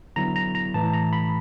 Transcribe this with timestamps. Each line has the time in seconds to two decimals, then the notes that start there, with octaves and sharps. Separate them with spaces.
0.16 D3 F#3 B3 E4 A#5
0.36 A#5
0.55 A#5
0.74 A2 E3 A3 A5
0.94 A#5
1.13 B5